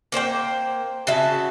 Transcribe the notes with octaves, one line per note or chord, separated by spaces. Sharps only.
A#3 C5 C#5 G5
C#3 F#4 E5 A5